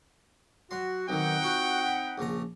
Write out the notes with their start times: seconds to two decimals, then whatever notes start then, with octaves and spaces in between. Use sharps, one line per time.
0.71 F#3 F#4 C6
1.09 B1 D#3 C4 D#4 F#5 G5
1.42 F4 F#4
1.86 B5
2.18 A#1 C#3 A#5